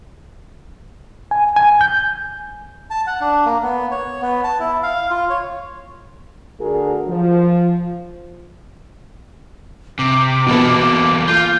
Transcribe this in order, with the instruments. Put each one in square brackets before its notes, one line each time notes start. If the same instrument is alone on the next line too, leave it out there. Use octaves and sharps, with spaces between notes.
[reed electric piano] G#5
G#5
G6
[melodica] A5
F#5
D4
A#3
B3
C#5
B3
A5
E4
F5
F4
C#5
[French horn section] D3 A3 F#4 G#4 A#4
F3
[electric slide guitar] C3 [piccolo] D6
[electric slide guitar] E2 A#3 A4 [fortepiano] B2 B3
[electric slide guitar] F4 [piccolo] G6